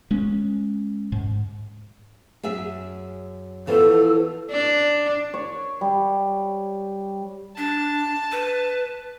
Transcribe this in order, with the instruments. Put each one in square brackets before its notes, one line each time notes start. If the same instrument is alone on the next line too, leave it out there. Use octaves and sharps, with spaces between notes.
[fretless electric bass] G#3 C#4
G#2
[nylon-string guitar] F#2 G#4 E5
[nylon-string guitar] E3 F3 B3 [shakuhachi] A4
[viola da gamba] D4
[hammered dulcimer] C#5
G3
[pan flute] D4 [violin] A5
[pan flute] B4